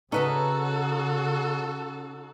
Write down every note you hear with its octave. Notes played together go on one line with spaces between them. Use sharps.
C#3 C#4 D#4 F#4 A4 B4 D#5